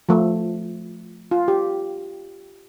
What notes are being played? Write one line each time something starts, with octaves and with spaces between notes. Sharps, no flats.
F3 A3
F4
G4